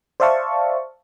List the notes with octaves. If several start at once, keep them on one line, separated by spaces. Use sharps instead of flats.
C5 D5 E5 F5 A5 C#6